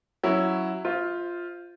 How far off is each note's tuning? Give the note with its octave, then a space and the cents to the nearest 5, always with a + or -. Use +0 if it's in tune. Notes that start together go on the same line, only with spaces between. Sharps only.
F#3 +0 C#4 +0 E4 +0
F4 +0 C5 +0 E5 -40